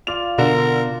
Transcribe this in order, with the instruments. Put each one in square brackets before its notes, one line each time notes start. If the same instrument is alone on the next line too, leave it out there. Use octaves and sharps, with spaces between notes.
[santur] F4 D5 F5 [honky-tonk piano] F7
[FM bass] B2 [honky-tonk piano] D3 [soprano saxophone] A#4